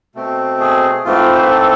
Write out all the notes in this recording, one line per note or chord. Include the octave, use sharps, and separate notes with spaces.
B2 A3 C4
G#4
G#2 E3 A3 C4 F4
C5
B4
A4